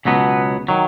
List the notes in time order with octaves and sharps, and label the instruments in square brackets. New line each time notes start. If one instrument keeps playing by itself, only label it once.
[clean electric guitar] C#2 B2 F#3 B3
D#3 F#3